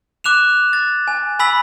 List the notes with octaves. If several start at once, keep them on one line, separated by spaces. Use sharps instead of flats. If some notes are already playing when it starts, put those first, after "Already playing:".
D6 F#6 E7 F7
A6
G#5
G#5 B5 E6 B6 F#7